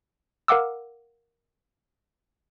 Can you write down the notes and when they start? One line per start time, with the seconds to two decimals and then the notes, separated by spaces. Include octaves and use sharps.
0.48 A#4 F5 F#5 D6 E6